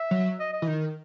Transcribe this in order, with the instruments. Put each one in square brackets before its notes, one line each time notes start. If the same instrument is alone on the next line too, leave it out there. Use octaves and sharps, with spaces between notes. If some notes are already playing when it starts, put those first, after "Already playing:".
Already playing: [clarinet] E5
[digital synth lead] F#3
[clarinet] D#5
D#5
[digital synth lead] E3
D#3